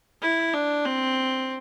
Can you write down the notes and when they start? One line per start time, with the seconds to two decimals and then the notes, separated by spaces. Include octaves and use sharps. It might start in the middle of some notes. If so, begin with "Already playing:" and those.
0.22 E4
0.53 D4
0.85 C4